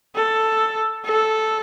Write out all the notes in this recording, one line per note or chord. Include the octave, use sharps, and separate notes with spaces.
A4
A4